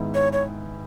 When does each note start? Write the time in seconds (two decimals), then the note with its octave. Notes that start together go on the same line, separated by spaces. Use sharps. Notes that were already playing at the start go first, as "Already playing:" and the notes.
Already playing: G#1 G#2 G#3 B3 E4
0.14 C#5
0.33 C#5